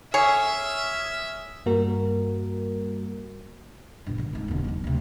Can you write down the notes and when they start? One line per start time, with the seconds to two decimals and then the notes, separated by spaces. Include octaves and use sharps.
0.14 G#4 C#5 E5 G#5 D#6 F6
1.66 G2 G3 A#3 F#4 A#4
4.06 G2 A#2
4.18 D3 D#3
4.33 F2 G#2
4.48 D#1 D3
4.64 D#2 F#3
4.84 D2 C3